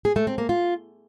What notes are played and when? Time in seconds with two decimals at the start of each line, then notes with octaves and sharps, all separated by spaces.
0.05 G#4
0.16 A3
0.27 C4
0.38 A#3
0.49 F4